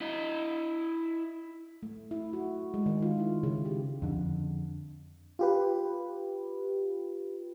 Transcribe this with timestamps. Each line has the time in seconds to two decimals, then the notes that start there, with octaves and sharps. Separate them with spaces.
0.01 E4 D#5
1.83 A3
2.11 E4
2.33 F#4
2.74 G#3
2.86 D#3
3.02 F4
3.19 E4
3.43 C#3
3.65 G4
4.02 F2 D3
5.39 F4 G4 B4